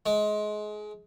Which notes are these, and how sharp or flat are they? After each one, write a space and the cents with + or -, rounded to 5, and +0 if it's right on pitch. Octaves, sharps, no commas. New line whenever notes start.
G#3 +25